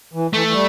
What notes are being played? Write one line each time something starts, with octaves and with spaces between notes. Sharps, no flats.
E3
E3 A3
E3
G3